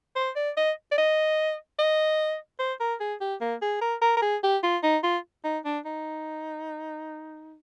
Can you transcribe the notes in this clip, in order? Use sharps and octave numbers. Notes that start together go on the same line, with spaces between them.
C5
D5
D#5
D5
D#5
D#5
C5
A#4
G#4
G4
A#3
G#4
A#4
A#4
A#4
G#4
G4
F4
D#4
F4
D#4
D4
D#4